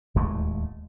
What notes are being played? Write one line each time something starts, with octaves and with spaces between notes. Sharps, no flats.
D1 D#2 G#3 A3